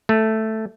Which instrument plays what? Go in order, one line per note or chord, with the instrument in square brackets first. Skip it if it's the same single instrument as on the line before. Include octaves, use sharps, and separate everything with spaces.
[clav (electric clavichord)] A3